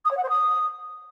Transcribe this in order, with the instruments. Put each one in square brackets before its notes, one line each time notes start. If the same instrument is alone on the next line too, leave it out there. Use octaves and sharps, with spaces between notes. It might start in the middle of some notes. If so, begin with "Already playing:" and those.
[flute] D#6
C#5
F#5
C5
D#6